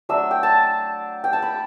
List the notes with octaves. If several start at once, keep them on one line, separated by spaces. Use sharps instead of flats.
F#3 A3 D4 E6
G5
A5
G5
A5
B5